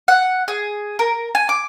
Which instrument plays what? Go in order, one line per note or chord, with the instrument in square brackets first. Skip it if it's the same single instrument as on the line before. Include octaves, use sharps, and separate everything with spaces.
[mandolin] F#5
G#4
A#4
G#5
D6